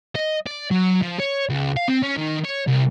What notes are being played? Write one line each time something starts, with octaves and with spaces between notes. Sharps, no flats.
D#5
D5
F#3
F3
C#5
C#2
F5
C4
C#4
D#3
C#5
C2